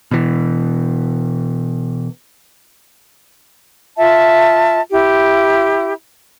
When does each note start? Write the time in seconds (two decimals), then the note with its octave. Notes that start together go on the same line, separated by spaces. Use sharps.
0.11 B2 E3
3.98 F4 E5 A5
4.92 E4 G4